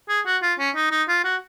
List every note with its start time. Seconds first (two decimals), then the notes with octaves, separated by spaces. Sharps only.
0.09 G#4
0.26 F#4
0.42 F4
0.59 C#4
0.75 D#4
0.92 D#4
1.08 F4
1.24 F#4